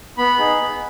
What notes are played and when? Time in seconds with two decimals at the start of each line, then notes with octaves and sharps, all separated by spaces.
0.18 B3 B5
0.39 D#4 G#4
0.59 B3